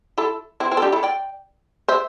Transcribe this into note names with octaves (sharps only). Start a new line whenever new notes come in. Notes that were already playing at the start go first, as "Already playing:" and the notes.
E4 A4
C4 E4
C4 E4
A4
D4 G4
E4 A4
D5 G5
C5 E5